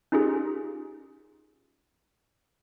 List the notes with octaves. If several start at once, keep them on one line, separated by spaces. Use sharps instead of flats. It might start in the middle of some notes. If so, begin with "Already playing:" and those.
C#4 D#4 F4 G4 G#4